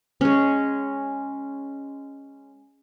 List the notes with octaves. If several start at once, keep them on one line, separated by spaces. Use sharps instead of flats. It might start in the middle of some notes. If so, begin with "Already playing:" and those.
G#3 C#4